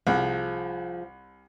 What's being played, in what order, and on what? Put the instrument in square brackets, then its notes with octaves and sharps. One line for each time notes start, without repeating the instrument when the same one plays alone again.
[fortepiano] C2 [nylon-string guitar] F3 G#4